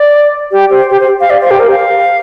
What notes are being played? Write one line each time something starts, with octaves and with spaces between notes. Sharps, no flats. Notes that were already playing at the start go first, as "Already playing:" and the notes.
Already playing: D5
G4
C5
G4
C5
F5
D5
C5
G4
A#4
F5